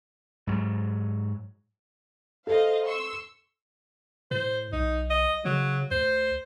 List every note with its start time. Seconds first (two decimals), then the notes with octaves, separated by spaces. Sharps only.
0.47 G#2 F#3
2.47 A4 C5 D#5 F5
2.84 C6 C#6 E6
4.31 A2 C5
4.73 B1 D#4
5.10 D#5
5.45 C#3 F#3
5.91 D2 C5